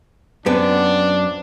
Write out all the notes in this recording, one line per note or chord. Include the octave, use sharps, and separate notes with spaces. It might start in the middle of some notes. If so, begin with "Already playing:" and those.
F#2 B3 C4 D4